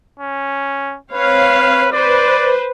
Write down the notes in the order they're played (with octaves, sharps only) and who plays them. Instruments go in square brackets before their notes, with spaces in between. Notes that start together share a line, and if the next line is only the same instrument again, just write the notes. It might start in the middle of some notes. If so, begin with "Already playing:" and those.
[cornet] C#4
[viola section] C4 C#5 F5 [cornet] B4
[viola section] B4 C5 [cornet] D5